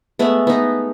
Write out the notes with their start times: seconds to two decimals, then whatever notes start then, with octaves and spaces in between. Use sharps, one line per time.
0.19 G#3 A3 B3
0.47 B3 D#4